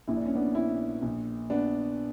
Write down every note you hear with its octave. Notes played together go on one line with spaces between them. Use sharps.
A#1 A#2 E4
D4
C#4
B3 D4
C#4 E4
A#1 A#2
B3 D4